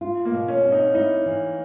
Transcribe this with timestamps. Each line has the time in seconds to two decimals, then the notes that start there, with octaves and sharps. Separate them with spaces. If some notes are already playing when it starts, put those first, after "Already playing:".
0.01 F4
0.25 A#3
0.33 B2
0.48 C#4
0.64 C4
0.72 D#4
0.94 D#4 E4
1.26 E3